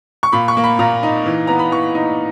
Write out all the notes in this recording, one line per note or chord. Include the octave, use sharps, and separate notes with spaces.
C#6
A#2 B5
C#6
A#3
B5
A#2 A#5
D#4
E3
B3 A#5
B5
E3 C#6
D#4